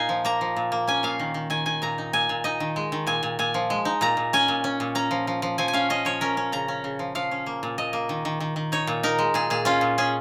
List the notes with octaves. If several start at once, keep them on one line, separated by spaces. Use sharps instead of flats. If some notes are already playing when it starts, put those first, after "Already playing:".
Already playing: A#2 D#4 F5 G#5
F3
A#3 A#5
F3
A#2
A#3
C#4 G#5
A#2 F5
D#3
D#3
D#3 G#5
D#3 G#5
A#2 A#5
D#4
A#2 G#5
A#2
D#4 D#5
D#3
G#3
D#3
A#2 G#5
A#2
A#2 G#5
F3
G#3
D#4
A#2 A#5
A#2
C#4 G#5
A#2
C#4
A#2
C#4 A#5
F3
F3
F3
F3 G#5
G#5
C#4 F5
C#4 D#5
F3 C#5
C#4 A#4
C#4
C#3 A#5
C#4
C#3
F3
F3 F5
C#4
A#3
A#2
A#2 D#5
A#3
D#3
D#3
D#3
D#3
D#4 C#5
A#2
D#4 A#4
G#3
A#2 G#4
A#2 G#4
C#4 F4
A#2
C#4 G#4